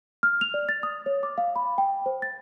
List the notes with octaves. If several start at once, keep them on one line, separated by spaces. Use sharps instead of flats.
F6
F7
D5
A6
D#6
C#5
D6
F5
B5
G5
C5
A6